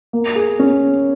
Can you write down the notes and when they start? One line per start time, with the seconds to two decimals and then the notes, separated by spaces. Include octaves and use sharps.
0.13 A#3
0.36 G#4
0.59 C#4